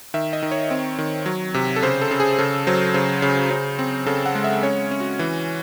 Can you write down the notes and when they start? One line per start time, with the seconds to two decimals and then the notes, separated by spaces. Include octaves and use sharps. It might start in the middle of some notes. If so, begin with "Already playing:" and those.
0.14 D#3 E5
0.33 D#5
0.42 D#3
0.51 C#5
0.71 C4
0.98 D#3
1.26 F#3
1.54 C3
1.76 A4
1.82 C#3 C5
2.01 A4
2.11 C#3
2.20 G#4
2.38 C#3 A4
2.67 F#3 C5
2.94 C#3 C5
3.22 C#3
3.51 C#3
3.79 C4
4.06 C#3 A4
4.26 F#5
4.35 G#3
4.44 E5
4.63 C#4 C#5
4.91 C#4
5.00 F#4
5.19 E3